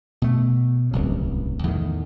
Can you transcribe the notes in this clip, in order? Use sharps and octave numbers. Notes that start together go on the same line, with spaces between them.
B2 A3
D1 C2 C#3
E2 A2 D#3